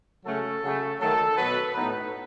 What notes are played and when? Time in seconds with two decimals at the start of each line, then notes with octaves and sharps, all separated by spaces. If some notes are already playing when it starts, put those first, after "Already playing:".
0.25 C#3 F#3 A3 C#4 A4
0.62 C#3 F#3 A3
0.99 D#3 F#3 A3 A4
1.37 B2 F#3 B3 B4
1.75 A2 F#3 B3 D#4